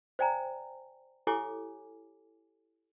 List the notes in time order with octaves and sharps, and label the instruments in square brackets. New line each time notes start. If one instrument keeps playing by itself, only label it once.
[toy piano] C5 D5 G5 G#5 A#5
E4 G4 A4 C#5 G#5 D6